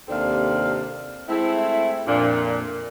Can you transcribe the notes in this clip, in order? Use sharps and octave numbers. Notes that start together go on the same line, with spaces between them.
D#2 C3 C4 D4 A4 F5
G#3 A3 C4 E4
F2 A#2 D4